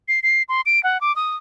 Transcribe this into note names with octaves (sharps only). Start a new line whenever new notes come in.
C7
C7
C6
D7
F#5
D6
D#6